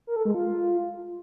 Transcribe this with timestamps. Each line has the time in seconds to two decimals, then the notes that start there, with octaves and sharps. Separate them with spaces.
0.07 A#4
0.16 A4
0.25 G#3
0.34 F4